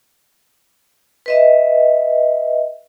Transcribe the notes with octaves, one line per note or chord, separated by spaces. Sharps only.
B4 D#5 E5